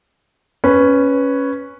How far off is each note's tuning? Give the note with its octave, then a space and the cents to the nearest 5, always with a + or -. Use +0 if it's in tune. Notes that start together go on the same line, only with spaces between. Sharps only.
C#4 +0 B4 +0